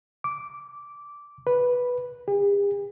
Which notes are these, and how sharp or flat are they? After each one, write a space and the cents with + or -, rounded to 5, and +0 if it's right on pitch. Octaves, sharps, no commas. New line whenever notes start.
D6 -10
B4 -5
G4 +45